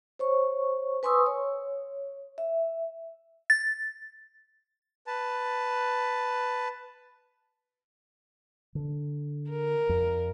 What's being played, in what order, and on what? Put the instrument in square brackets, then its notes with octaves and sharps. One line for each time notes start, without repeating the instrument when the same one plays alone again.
[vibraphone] C5 C#5 C#6
B4 G#5 C6 C#6 D#6 E6
C#5
E5
[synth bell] A6
[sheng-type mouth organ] B4 A5
[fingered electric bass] D3
[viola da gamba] A#4
[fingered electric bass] F2